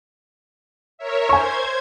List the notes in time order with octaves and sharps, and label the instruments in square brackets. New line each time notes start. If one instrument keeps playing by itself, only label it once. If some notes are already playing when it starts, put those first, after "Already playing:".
[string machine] A#4 C#5 E5
[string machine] C5 G#6 [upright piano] G#5 C#6